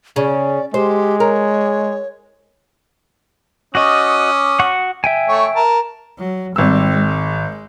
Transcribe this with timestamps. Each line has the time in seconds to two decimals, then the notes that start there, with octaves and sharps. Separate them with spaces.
0.16 C#3 C#4 D5
0.74 G#3 G4 C5
1.20 A#4 C#5
3.75 C#4 F#4 D#5 D6 D#6
4.59 F#4 F#5 C#6
5.04 E5 G5 G#5
5.28 A3 C#5
5.56 A#4 A5
6.18 F#3
6.56 G#1 G3 C4 E6
6.91 G#3